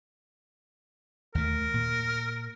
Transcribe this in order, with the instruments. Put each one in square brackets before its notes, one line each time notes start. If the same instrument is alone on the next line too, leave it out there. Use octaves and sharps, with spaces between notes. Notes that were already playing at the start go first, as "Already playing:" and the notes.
[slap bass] D#2 A3 [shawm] A#4
[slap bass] A#2